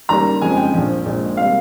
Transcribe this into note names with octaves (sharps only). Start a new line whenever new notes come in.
D#2 C#3 G3 A#3 A#5
F2 C#3 F3 G#3 G#5
G5
A#1 A#2 F3
A#1 A#2 G#3
C3 G3 A#3 F5